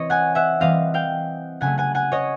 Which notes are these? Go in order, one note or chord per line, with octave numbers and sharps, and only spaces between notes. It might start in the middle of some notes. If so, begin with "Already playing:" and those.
Already playing: E3 C4 C#5 D#5
F#5 G#5
E5 F#5
E3 G3 C4 D#5 F5
F5 G5
C#3 F#3 A3 F#5 G#5
F#5 G#5
F#5 G#5
C#5 D#5